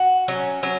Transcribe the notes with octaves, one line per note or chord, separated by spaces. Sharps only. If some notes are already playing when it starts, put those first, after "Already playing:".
Already playing: F#4
F#3 C#4
F#3 C#4